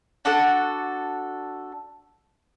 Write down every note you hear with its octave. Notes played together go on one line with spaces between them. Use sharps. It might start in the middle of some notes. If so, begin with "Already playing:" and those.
D4 F#4 A4 F#5